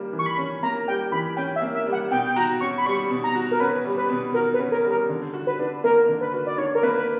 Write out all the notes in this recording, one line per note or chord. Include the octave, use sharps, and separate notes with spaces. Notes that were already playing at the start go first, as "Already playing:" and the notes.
Already playing: G3 A#3 C#4
E3
C#6
B5
C#4
A#3 A#5
G3 G5
E3 B5
C#4 G5
E5
A#3
E5
G3
F#5
B2 G5
G5
F#4 A#5
C#4 C#6
B5
G3 C#6
B2
A#5
F#4
A#4
C#4 B4
G3
B4
B2
F#4 A#4
B4
C#4
A#4
G3
A#4
D3
F#4
B4
D4
A#3 A#4
D3
B4
F#4
D5
D4 C#5
A#4
A#3 B4
B4